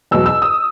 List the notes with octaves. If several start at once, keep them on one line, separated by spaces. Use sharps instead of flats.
E2 B2 F#3 E6
E6
D#6